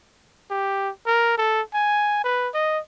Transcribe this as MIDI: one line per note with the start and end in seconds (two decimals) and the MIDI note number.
0.51 0.90 67
1.06 1.34 70
1.38 1.61 69
1.74 2.22 80
2.24 2.49 71
2.54 2.79 75